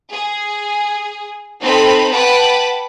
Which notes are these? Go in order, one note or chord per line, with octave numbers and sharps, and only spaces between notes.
G#4
C4 D#4 A4 B5
B4 F#5 G5 A5 B5 D6